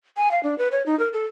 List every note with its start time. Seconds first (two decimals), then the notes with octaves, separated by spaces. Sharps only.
0.17 G#5
0.31 F5
0.43 D4
0.58 B4
0.72 C#5
0.86 D#4
0.99 A#4
1.13 A4